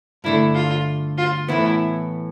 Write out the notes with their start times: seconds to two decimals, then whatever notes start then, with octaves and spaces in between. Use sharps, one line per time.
0.24 G2 D3 A3 E4
0.55 F4
1.18 F4
1.48 A2 E3 B3 E4